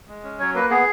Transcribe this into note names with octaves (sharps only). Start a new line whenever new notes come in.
G#3
C#4
F#3 C#5
A#3 B4
B3 G#4